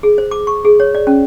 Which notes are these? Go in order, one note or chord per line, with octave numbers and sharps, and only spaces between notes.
G#4
C5
D6
C#6
G#4
C#5
D5
C#4